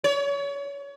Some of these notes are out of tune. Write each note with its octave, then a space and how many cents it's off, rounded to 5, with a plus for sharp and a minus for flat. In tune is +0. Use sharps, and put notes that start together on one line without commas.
C#5 +30